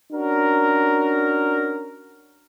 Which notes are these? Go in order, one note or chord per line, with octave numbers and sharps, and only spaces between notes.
C#4 D4 F#4 A#4